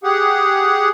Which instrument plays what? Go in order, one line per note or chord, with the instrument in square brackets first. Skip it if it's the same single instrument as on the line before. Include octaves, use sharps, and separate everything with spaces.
[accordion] G4 G#4 F#5